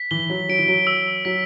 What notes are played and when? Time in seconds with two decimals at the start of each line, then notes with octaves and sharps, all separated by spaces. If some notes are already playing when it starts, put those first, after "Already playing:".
Already playing: B6
0.11 E3 G7
0.30 F#3
0.49 F#3 D7
0.58 E3
0.68 F#3
0.87 E6
1.25 F#3 B6